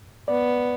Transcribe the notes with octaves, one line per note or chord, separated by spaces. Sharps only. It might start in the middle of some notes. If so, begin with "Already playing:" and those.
B3 D5